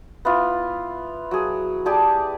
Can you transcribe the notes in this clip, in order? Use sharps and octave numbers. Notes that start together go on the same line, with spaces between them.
B3 E4 F4
F#3 G#4
G4 G#4 D5 A5